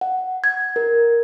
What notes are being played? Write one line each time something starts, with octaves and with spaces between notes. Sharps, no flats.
F#5
G#6
A#4